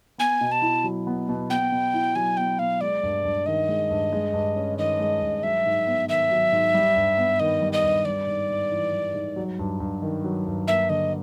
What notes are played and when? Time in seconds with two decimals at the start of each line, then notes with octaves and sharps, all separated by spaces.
0.18 B3 G#5
0.41 B2
0.52 A5
0.62 E4
0.84 F#3
1.07 B3
1.29 B2
1.50 B3 G5
1.72 B2
1.94 E4
2.15 F#3 G#5
2.37 B3 G5
2.59 B2 F5
2.81 G#3 D5
3.03 G2
3.25 G2
3.46 D#3 D#5
3.69 G#3
3.90 G2
4.13 G#3
4.33 G2
4.56 C#4
4.78 D#3 D#5
5.00 G#3
5.22 G2
5.43 F#3 E5
5.66 G#2
5.87 B3
6.08 D#3 E5
6.31 F#3
6.52 G#2
6.74 G3
6.96 G2
7.17 B3
7.40 D#3 D#5
7.62 G3
7.73 D#5
7.84 G2
8.05 G3 D5
8.27 G#2
8.49 G#2
8.71 E3
8.93 G3
9.14 G#2
9.36 F#3
9.59 G2
9.80 G2
10.02 D#3
10.24 F#3
10.46 G2
10.67 A#3 E5
10.89 D3 D#5